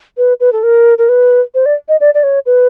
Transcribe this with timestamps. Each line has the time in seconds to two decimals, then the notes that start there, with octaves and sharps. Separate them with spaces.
0.17 B4
0.40 B4
0.53 A4
0.63 A#4
0.98 A#4
1.09 B4
1.55 C5
1.66 D5
1.89 D#5
2.01 D5
2.14 D5
2.23 C#5
2.46 B4